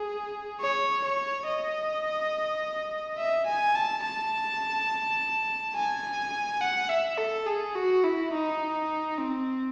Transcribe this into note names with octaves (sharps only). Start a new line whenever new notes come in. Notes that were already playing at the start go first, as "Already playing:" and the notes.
Already playing: G#4
C#5
C#5
D#5
E5
G#5
A5
A5
G#5
F#5
E5
A4
G#4
F#4
E4
D#4
C4